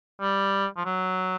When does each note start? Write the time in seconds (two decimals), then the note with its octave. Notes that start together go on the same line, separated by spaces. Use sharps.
0.21 G3
0.77 F3
0.85 F#3